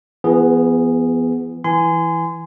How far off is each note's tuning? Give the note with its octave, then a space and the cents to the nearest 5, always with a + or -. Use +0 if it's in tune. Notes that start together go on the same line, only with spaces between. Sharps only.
E3 +45 B3 +0 G#4 -10
E3 +0 G#5 +0 C6 -30